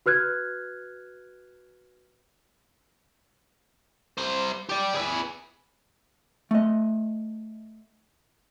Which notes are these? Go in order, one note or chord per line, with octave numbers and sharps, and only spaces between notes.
F#4 B4 F6 F#6 G#6
G3 C5
G4 D5
G#4 B4
A3 D#5